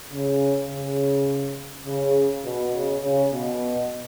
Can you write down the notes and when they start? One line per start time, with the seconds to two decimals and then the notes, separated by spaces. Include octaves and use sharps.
0.11 C#3
0.69 C#3
1.86 C#3
2.44 B2
2.73 C#3
3.02 C#3
3.32 B2